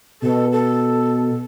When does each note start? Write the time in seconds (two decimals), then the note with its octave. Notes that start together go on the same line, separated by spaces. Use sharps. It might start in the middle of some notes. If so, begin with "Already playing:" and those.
0.22 B2 A4
0.52 A4